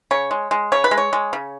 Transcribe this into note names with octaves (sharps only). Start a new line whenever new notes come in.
C#3 C#5
G#3
G#3
C#3 C#5
B4
G#3
C#5
G#3
C#3